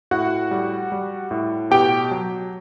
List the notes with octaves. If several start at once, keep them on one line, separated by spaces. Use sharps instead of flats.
A2 F#4 F#5
G3
G3
A2
B2 G4 G5
F#3